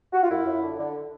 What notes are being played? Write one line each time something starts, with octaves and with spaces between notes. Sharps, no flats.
F#4
F4
F#2 E4
F#2
D3
D3